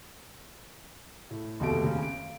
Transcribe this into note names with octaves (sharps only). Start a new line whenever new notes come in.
A2
F1 D#2 B2 A3 D7
D#2 C#3
D7